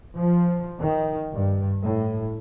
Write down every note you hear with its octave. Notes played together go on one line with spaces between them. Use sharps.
F3
D#3
G2
A2